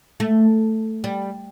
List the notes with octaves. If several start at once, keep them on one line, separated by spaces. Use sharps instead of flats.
A3
G3